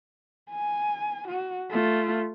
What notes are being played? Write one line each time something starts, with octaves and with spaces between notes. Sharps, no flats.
G#5
F#4
A3 F4